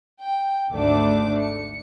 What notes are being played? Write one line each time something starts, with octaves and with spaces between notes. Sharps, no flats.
G5
G#1 D2 A3 D4 D6
C#7